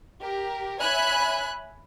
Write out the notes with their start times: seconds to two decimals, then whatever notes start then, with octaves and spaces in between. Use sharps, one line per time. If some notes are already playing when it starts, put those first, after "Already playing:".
0.21 G4 A#4
0.81 C#5 E5 G#5 B5 F#6